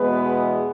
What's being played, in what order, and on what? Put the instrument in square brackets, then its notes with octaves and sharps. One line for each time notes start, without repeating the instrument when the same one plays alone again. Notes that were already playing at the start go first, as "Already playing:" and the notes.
Already playing: [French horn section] E2 B2 G#3 B3 B4